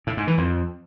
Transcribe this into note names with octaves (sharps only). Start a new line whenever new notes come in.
A2
G#2
E3
F2